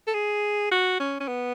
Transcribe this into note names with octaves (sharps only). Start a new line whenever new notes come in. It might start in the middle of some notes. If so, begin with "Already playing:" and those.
A4
G#4
F#4
C#4
C#4
B3